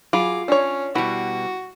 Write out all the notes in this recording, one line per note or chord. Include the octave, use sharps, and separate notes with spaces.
F#3 F4 G#4 B5 D6
C#4 D4 C#5
B2 G3 E4 F#4